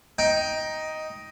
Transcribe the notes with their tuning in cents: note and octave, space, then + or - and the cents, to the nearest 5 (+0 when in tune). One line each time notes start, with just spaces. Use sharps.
D#4 +10 G5 +0